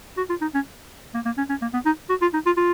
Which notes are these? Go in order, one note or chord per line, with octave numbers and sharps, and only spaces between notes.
F#4
F4
D#4
C#4
A#3
A#3
C#4
C#4
A#3
B3
D#4
F#4
F4
D#4
F4
F4